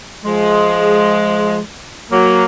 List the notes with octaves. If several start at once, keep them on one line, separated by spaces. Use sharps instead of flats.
F3 G#3
F#3 A#3